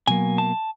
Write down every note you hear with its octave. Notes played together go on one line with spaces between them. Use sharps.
B2 F#3 A#3 G#5
A5